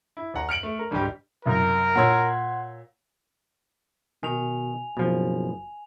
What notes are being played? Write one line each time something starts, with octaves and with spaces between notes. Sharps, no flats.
E4
D#2 D5 F#5 A#5
F6 C#7 D7 F#7
A3
A#4
C#2 G#2 D3 G3 G4
C2 F#2 A#4
A#2 C#5 F#5 C6 E6 G#6
B2 D#3 G#5 F7
F#1 B2 F3